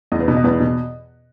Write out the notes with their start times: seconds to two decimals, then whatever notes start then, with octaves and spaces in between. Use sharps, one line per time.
0.12 E2 D#5
0.20 B4
0.28 B2
0.37 D#5
0.44 E2 B4
0.60 B2